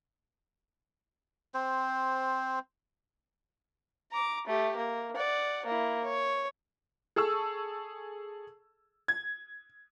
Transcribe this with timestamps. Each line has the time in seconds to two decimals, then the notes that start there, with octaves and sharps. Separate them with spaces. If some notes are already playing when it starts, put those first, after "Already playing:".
1.54 C4 C5
4.12 A#5 D6
4.47 A3 G4
4.76 A#3
5.16 D5 F#5
5.65 A#3 E4
6.04 C#5
7.16 G#4 A4 A5 C#6 E6
9.08 G#6